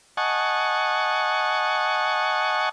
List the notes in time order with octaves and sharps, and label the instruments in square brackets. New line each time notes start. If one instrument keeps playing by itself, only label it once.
[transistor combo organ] D#5 F#5 G#5 A5 C#6